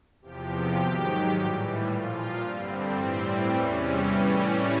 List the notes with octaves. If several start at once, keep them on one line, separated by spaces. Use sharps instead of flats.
E2 C3 F3 G4
G#2 D#3 F#3
A2 E3 G3
A#2 F3 F4
G2 D3 G3 C4
A2 E3 G3 C4
E2 C3 E3 G3 C#4
A2 E3 G3 C#4